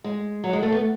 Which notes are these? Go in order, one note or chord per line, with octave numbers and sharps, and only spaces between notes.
G#3
F#3
G#3
A3
B3